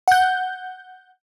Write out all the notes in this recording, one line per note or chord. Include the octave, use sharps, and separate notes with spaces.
F#5 G6